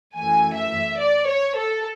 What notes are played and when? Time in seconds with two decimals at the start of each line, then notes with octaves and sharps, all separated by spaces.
0.15 F#2 E3 A3 G#5
0.56 E5
1.00 D5
1.27 C#5
1.56 A4